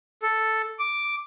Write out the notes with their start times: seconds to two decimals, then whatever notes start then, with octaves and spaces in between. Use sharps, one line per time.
0.23 A4
0.79 D6